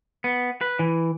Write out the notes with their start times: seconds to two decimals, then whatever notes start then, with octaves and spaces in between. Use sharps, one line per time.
0.24 B3
0.61 B4
0.79 E3